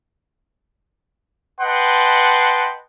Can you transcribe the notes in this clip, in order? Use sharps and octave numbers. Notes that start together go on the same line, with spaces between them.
B4 D#5 F#5 G5 A5 C6